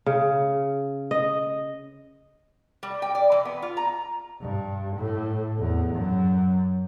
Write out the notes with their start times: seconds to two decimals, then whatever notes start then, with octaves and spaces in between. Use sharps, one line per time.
0.06 C#3
1.11 D#5
2.83 G3
3.02 G5
3.15 D5
3.32 E3
3.45 B3
3.62 F4
3.77 A#5
4.42 G2
4.97 A2
5.58 E2
5.95 F#2